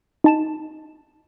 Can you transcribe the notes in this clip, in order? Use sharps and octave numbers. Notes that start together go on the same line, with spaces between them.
D#4 A5 E7